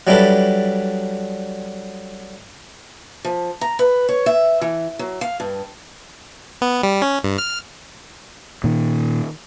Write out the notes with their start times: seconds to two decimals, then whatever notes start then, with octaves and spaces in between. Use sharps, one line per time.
0.07 F#3 G3 D4 E4 A4 B4
3.25 F3
3.61 A#5
3.79 B4
4.09 C#5
4.26 E5
4.61 E3
4.99 F#3
5.21 F5
5.40 G2
6.62 B3
6.83 G3
7.02 C#4
7.24 G2
7.38 F6
8.64 A#2 D#3